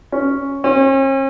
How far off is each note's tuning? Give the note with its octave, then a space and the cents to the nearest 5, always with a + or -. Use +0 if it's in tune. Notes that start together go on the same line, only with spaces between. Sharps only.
C#4 +0
C#4 -45